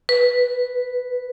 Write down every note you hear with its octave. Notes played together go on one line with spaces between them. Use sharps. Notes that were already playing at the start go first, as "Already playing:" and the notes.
B4